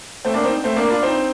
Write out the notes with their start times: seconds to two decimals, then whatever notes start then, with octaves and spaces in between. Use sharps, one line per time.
0.25 A3 C4
0.34 A#3 D4
0.44 C4 D#4
0.64 A3 C4
0.76 A#3 D4
0.90 D4 F4
1.03 C4 D#4